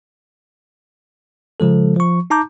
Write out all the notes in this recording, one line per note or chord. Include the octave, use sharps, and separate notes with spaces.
C#3 F3 G#3 A4
F3 C#6
D#4 A5 A#5 D6 G6